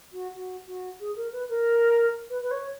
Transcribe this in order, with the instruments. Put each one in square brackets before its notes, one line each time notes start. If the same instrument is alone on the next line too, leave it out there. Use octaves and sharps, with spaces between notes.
[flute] F#4
F#4
F#4
G#4
A#4
B4
A#4
B4
B4
C#5